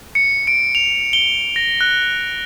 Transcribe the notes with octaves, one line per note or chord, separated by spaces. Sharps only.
C#7
D7
F7
G7
A#6
F#6